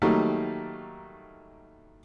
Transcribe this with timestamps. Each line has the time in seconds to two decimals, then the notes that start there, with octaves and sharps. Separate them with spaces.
0.02 D#3 F#3 G3 A3 A#3 D#4